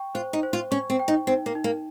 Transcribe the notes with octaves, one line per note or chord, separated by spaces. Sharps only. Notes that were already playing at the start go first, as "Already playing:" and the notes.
Already playing: G5 C#6
F4 C5
D#4
C5
F4
C#4 C#6
C4
G5
D#4
C4 D#4
A#3
D#4
A#3